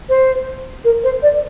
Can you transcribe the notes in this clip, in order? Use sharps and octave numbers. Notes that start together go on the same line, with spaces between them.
C5
A#4
C5
D5